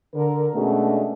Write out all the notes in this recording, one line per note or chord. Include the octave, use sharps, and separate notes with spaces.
D3 A#4
B2 G#3 A3 C#4 D4 F#4